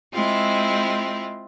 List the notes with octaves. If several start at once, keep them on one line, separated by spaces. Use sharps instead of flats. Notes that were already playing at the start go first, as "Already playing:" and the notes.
G#3 C4 E4 F4